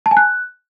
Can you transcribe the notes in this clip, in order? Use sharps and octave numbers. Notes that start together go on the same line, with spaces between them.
A5
G#5
F#6